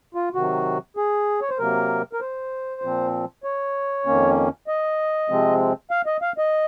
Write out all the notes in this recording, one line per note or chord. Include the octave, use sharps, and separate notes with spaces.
F4
C3 D#3 F#3 F#4
G#4
C#5
C5
C3 F#3 A#3 A#4
A#4
C5
A#2 F3 C4
C#5
F2 D#3 A#3 C#4
D#5
C3 F3 G#3 C4
F5
D#5
F5
D#5